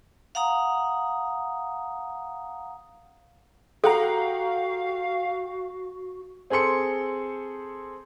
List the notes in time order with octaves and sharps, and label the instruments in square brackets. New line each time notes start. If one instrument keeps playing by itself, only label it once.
[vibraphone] F5 F#5 A#5 D#6
[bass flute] F#4 [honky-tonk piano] G4 F#5 A#5 [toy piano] A4 [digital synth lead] F5
[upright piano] C4 G#4 A4 C6 C#7